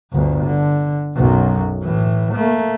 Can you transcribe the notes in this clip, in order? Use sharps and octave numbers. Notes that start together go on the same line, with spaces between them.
G1 D2
D3
B1 F#2
A2 E3
A3 A#3